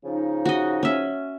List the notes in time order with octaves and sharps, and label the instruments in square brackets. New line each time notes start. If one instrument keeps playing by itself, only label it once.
[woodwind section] C#3 F3 D#4
[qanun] F#4 D#5
C#4 E5